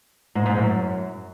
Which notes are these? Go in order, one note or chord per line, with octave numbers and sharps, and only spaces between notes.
G#2
G#2
F#2